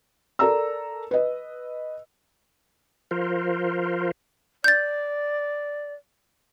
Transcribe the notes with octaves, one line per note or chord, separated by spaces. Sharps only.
A4 A#4 D5 A#5 E6
B4 D#5
F3 F4 A#4 C5
D5 G6 A6